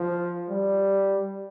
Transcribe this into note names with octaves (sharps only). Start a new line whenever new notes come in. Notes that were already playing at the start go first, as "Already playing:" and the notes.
Already playing: F3
G3